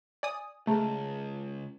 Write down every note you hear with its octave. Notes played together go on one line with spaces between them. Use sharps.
D5 G#5 D#6
C#2 A3 G#4 A5 A#5